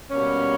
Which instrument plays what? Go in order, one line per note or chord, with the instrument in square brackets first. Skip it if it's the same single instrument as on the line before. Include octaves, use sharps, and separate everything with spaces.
[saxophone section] B2 G3 A#3 C#4